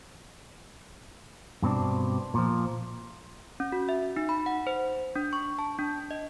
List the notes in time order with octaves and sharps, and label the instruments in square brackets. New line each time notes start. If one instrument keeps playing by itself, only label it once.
[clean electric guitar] G2 B2 C4 D4
A#2 F3
[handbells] C#4
F#4
E5
D#4
B5
F#5
C5
D4
C#6
A5
D4
D#5